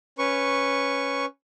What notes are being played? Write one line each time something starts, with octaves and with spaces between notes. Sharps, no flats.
C#4 B4 C#6